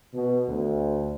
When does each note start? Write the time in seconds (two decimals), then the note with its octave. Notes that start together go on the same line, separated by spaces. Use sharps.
0.13 B2
0.47 D2